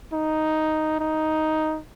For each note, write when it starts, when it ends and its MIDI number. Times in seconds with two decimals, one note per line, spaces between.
0.13 0.95 63
1.00 1.80 63